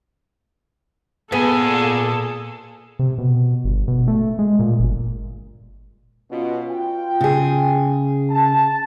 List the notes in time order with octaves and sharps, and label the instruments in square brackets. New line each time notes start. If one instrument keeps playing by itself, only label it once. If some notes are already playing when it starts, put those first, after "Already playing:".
[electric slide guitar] A#2 G#5 [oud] B3 [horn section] G#4 [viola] A4
[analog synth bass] C3
B2
G1
B2
A3
G#3
A#2
G1
[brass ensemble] B2 C#4 F4
F4 G5
[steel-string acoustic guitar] C#3 G#4
[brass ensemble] A5